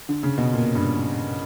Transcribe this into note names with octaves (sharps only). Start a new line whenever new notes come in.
D3
C#3
B2
A#2
G2